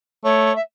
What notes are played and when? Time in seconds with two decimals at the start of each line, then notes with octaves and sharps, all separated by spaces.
0.24 A3 C#5
0.56 E5